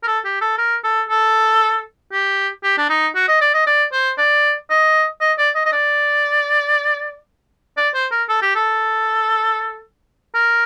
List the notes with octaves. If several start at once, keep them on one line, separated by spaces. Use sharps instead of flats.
A#4
A4
G4
A4
A#4
A4
A4
G4
G4
D4
D#4
F#4
D#5
D5
D#5
D5
C5
D5
D#5
D#5
D5
D#5
D#5
D5
D5
C5
A#4
A4
G4
A4
A#4